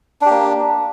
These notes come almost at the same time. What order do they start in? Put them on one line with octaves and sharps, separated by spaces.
D4 G4 A#3